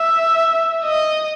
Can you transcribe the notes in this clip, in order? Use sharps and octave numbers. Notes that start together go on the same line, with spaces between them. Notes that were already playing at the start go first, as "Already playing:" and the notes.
Already playing: E5
D#5